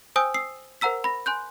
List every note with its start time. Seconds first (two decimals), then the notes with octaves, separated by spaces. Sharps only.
0.16 C5 G5 G#5 D#6 E6 G6
0.34 D#6 E6 C7
0.81 A#4 C5 F#5 A#5 E6 B6
1.04 B5 A#6
1.26 G#5 C6 F#6 G6